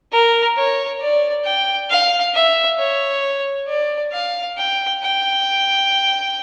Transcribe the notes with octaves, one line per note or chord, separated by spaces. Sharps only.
A#4
C#5
D5
G5
F5
E5
C#5
D5
F5
G5
G5